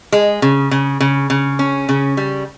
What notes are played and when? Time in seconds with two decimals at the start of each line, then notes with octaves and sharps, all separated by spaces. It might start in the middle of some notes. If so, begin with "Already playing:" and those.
0.12 G#3
0.42 C#3
0.71 C#3
1.00 C#3
1.30 C#3
1.59 C#4
1.89 C#3
2.17 G3